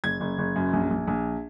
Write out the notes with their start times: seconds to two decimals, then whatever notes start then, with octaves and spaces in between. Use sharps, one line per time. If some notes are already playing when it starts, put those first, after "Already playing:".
0.04 F#1 G#6
0.20 F#1
0.38 F#1
0.56 F#2
0.73 A#1
0.90 A#1
1.08 A#1